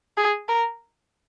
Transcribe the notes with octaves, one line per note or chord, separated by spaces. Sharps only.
G#4
A#4